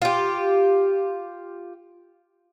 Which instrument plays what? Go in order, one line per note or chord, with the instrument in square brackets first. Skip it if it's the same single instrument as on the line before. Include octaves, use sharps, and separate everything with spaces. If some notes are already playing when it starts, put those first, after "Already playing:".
[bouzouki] F4 G4